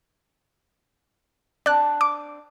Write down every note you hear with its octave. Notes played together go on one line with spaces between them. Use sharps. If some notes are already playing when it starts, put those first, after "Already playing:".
C4 D4 D5 F#6
D6